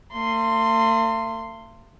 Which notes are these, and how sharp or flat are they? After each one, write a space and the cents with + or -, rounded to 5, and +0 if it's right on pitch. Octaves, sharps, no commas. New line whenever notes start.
A3 +45 C6 +0